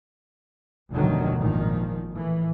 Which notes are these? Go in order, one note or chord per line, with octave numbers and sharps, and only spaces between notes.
F1 D2 B2 D3 D#3 F#3
G#1 A#2 D#3 F3
A2 E3